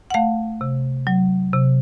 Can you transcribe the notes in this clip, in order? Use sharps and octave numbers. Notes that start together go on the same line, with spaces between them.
F#5
A3 F5
C3
F#3
C3